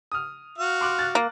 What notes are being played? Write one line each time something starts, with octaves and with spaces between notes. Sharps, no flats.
D#6 F6
F#4 F5
C6 D6 F#6
F#6 A6
A#3